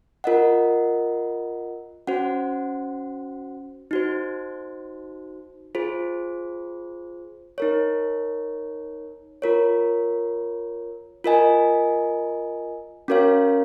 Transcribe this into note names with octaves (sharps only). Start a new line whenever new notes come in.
F4 A#4 D#5 F#5
C#4 F#4 C5 F#5
D#4 F#4 C5
F4 G#4 C5
D#4 A#4 C#5
F4 A#4 C#5
F4 A#4 D#5 G#5
C#4 F#4 A#4 C#5 F5